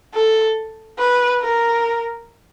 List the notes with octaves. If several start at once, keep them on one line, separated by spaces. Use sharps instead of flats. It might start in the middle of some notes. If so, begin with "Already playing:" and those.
A4
B4
A#4